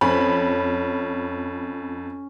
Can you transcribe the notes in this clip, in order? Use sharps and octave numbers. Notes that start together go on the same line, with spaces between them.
F2 C#4 B5